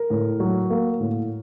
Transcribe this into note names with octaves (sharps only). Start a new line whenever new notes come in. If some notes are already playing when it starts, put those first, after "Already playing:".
Already playing: A#4
A2
F#3
A#3
A2